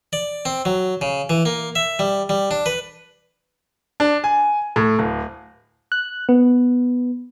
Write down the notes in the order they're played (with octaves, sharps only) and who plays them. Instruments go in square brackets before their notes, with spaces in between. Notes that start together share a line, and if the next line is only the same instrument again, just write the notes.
[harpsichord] D5
C4
F#3
C#3
E3
A#3
E5
G3
G3
D4
B4
[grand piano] D4
G#5
A2
D1
[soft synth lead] F#6
B3